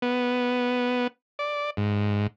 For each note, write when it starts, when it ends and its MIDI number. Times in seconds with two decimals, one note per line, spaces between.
0.02 1.07 59
1.39 1.70 74
1.77 2.27 44